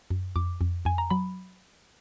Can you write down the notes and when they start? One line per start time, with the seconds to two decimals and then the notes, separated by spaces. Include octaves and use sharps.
0.10 F#2
0.36 F2 D6
0.61 F2
0.85 F2 G#5
0.98 A#5
1.10 F#3 B5